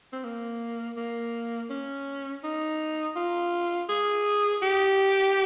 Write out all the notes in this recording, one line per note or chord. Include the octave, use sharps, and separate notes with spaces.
C4
A#3
A#3
C#4
D#4
F4
G#4
G4